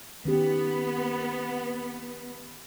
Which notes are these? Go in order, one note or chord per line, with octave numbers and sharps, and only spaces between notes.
D#3 B3 C#4 G4